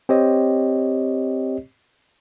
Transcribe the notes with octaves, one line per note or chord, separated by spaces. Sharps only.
C4 G4 C#5 D#5